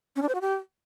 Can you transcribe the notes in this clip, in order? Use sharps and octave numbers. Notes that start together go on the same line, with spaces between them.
C#4
D4
C5
F#4
G4